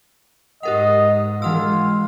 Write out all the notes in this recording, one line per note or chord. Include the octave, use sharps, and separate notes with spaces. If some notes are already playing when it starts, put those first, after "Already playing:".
G#2 G4 A#4 D#5 F#5
E3 G#3 F4 F#5 E6